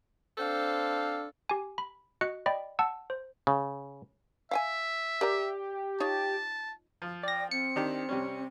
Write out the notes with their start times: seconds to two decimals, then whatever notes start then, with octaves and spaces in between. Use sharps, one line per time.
0.38 C4 D4 A4 C5 F5
1.49 G4 G#5
1.78 B5
2.21 F#4 D#5 F#6 C#7
2.46 D5 D#5 G5 B5
2.79 F#5 A5 E6
3.10 C5
3.47 C#3
4.51 E5 F5 G5 G#5
5.21 G4 A#4 D5 A#5
6.00 D#4 F4 C#5 A5
7.02 F3
7.23 D5 G5 A#6
7.51 C4 C#7
7.76 D#3 D4 G4
8.09 C3 G3 C#4